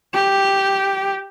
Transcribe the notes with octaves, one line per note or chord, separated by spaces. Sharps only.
G4